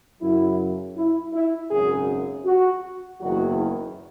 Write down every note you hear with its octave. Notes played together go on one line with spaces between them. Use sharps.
F#2 C#3 F#3 E4
E4
E4
G#1 F#2 C#3 G#4
F#4
F#1 E2 D#3 F#3 F#4